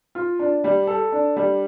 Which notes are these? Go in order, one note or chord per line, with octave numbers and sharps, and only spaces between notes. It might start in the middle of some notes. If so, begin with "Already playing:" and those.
F4
D4
G3
A4
D4
G3